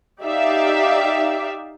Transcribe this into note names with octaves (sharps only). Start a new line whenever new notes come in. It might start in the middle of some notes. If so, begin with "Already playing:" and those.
D#4 G4 D5 E5 F5